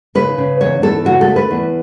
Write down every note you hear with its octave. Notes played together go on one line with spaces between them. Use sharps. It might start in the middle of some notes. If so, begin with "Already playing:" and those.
C#3 B4
C#3
E2 C#5
E2 A4
C#3 F#4
A4
A3
B4
E2